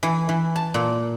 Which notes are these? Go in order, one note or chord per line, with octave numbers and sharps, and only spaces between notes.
E3
E3
A5
A#2